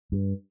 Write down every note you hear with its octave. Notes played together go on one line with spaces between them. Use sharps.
G2